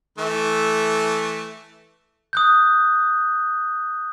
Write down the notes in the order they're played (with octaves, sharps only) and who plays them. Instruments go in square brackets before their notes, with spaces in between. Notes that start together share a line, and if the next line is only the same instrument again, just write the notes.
[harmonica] E3 A3
[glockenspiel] D#6 F#6 G6